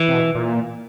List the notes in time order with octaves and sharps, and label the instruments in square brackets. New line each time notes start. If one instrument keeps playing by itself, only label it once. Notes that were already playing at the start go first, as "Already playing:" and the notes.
Already playing: [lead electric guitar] E3
[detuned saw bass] C3
B2
A#2